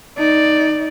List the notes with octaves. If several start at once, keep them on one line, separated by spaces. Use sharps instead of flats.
D#4 D5